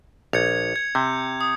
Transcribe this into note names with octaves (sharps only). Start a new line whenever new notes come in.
A#1 G#6 C#7 F7
G#6
C3 G6
D#6